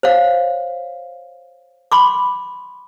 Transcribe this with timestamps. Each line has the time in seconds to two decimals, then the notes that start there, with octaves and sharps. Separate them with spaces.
0.03 C5 C#5 F5
1.92 B5 C6 D6